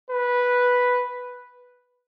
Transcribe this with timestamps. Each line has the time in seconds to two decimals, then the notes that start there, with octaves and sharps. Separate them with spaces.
0.10 B4